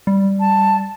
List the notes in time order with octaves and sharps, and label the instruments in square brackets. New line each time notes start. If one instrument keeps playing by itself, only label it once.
[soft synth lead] G3
[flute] A5